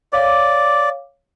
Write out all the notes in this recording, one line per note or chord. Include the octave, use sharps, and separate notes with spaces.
C#5 D5 F5 D6